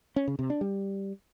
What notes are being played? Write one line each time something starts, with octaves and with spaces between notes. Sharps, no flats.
C#4
C#3
C3
D4
G3